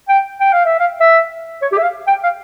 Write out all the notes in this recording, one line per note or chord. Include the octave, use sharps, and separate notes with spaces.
G5
G5
F5
E5
F5
E5
C#5
G4
E5
F5
G5
F5